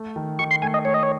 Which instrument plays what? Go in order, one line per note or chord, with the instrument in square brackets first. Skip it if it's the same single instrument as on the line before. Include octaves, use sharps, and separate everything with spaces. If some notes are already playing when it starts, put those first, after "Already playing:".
Already playing: [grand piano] A3
D#3
[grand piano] D#3 [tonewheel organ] C#6
[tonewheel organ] C6
[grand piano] A3 [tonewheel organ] G#5
[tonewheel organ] D#5
[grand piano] A3 [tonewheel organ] C#5
[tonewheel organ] D#5
C#5